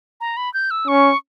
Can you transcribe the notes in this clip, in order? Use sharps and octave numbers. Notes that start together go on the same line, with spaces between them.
A#5
B5
G6
E6
C#4 C#6